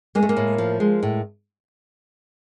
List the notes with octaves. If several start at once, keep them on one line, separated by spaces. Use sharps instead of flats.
G#3 A#3
A3
A#3
A2
F3
G#3
A2